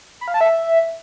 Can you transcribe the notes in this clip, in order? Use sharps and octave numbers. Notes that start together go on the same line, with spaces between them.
B5
F5
A5
E5